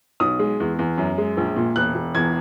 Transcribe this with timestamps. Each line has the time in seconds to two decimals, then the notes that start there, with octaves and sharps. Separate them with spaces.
0.20 B1 D#6
0.39 G#3
0.60 E2
0.79 E2
0.98 F#2
1.18 G#3
1.37 A#1
1.56 A#2
1.76 E1 F#6
1.95 E1
2.14 E2 G#6